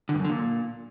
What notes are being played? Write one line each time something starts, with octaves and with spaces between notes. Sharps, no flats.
D3
G2
F#2
D3
A#2